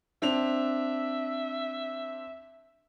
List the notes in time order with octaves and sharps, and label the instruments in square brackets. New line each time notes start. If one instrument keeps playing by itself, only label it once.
[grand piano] C4 D4 F7 [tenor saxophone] E5